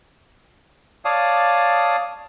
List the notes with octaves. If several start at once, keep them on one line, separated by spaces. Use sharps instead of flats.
C#5 D5 F5 A5 D#6